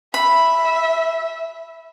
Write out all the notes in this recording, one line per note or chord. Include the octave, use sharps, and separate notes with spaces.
E5 B5